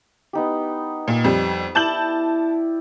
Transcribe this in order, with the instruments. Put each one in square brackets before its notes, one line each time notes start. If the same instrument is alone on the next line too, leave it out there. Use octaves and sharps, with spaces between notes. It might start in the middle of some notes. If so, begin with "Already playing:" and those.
[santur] B3 D#4 G4
[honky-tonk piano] A#2
F2 G3
[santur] E4 D5 [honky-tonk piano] A5 G6 F#7